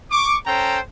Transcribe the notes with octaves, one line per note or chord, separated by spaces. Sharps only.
C#6 D6
C#4 A4 C5 G5 A#5